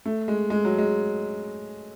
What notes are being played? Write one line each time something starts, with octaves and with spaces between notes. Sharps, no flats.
A3
G#3
G#3
F#3
G#3